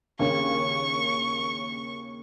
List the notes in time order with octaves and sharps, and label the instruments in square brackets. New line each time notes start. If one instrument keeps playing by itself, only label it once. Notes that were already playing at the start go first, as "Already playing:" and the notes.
[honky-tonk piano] D#2 C#3 A#3 C#4 [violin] C#6